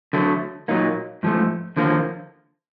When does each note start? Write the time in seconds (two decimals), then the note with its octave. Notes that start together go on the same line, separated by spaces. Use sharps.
0.13 D2 D3 F#3 A3
0.68 A#2 F#3 A#3 D#4
1.23 G#2 F3 A3
1.77 D#2 D3 F3 A#3